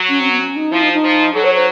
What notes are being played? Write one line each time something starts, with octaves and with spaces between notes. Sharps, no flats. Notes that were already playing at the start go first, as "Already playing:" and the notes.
Already playing: F#3
C#4
C4
B3
C#4
D#4
F3 E4
D#4
D#4
F3
F#3 A4
C#5
C5